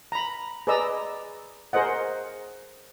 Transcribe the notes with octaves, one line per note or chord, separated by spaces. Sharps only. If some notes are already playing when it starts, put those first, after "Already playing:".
A#5 B5
G#4 B4 D5 D#5 A#5 E6
G#4 A#4 C5 D#5 F#5